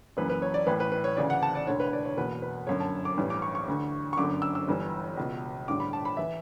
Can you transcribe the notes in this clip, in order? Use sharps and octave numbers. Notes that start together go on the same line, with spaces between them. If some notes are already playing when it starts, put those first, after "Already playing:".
F#1 F#2 E3 B4
B4
C#5
D5
A1 A2 E3 B4
B4
B4
C#5
D2 C#3 E3 D5
F#5
A5
D5
E1 D2 D3 C#5
B4
D5
C#5
F#1 E2 B2 B4
B4
G1 F#2 D3 C#5
A5
D6
A1 G2 E3
D6
C#6
C#6
D2 D3
C#6
G1 F#2 D3 D6
E6
E6
G1 G2 E3
C#2 B2
A1 G2 D3 D6
B5
A5
B5
E3 E5